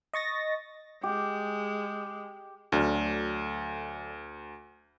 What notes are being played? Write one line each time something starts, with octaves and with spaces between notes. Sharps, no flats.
D#5 C#6 A6 A#6
G#3 G4
D2 D3 F#3 F6